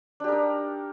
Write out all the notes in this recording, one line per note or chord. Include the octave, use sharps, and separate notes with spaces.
D4 D#4 G4 A#4